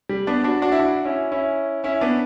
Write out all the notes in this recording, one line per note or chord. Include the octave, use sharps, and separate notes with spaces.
G3
B3 D4
D4 F#4
D4 F#4
E4
D4 F#4
C#4 E4
C#4 E4
C#4 E4
B3 D4